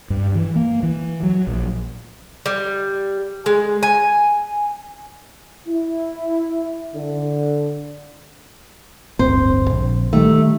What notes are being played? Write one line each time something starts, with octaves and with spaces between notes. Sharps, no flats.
G2
E3
A#3
E3
F#3
A#1
G3
G#3
G#5
E4
D3
D1 G1 C4 C5
A#1
D#3 G3 A3